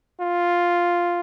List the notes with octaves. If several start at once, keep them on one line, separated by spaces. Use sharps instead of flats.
F4